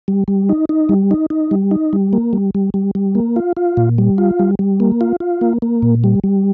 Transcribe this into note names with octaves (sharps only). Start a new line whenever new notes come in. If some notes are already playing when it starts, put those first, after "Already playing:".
G3
G3
D#4
D#4
G3
D#4
D#4
G3
D#4
G3
A#3
G3
G3
G3
G3
A#3
F4
F4
A#2
G3
F4
G3
G3
A#3
F4
F4
A#3
A#3
A#2
G3
G3